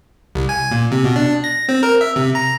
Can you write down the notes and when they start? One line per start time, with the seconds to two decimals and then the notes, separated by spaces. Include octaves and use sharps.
0.35 C2
0.49 G#5
0.71 A#2
0.92 C3
1.04 B2
1.16 D4
1.44 A#6
1.69 C4
1.83 A#4
2.01 E5
2.16 C3
2.35 A#5